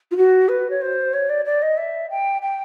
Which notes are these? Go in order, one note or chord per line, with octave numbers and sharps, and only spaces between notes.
F4
F#4
B4
C#5
C5
C#5
D5
D5
D#5
E5
G5
G5